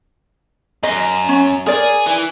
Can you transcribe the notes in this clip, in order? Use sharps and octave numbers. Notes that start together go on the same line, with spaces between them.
F#2 D#5
C#4
G#4 A#4 D5
E3